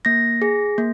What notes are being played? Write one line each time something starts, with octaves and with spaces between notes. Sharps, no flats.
A#3 A#6
G#4
A#3